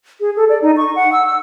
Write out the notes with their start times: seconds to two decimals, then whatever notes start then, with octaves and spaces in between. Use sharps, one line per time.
0.21 G#4
0.36 A4
0.49 D5
0.62 D#4
0.77 C#6
0.96 F#5
1.12 E6
1.26 E6